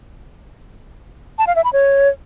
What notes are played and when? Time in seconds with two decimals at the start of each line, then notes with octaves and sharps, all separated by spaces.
1.38 A5
1.47 F5
1.56 E5
1.64 B5
1.73 C#5